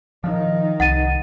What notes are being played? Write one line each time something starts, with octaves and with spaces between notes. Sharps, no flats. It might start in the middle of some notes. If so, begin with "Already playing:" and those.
D#3 F3 D#4
C2 F#5 A6 D#7